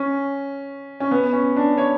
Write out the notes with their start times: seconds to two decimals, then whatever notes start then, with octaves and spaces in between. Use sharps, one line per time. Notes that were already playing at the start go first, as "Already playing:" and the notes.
Already playing: C#4
1.00 C#4
1.11 B3
1.33 C#4
1.56 D4
1.78 C#5